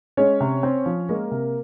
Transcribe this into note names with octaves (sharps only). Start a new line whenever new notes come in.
G#3 C#4 C#5
C3
C4
F3
G#3 A#3 A#4
C3